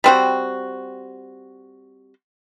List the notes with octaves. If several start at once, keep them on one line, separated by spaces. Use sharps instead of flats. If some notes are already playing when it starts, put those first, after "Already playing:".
G3 C4 F#4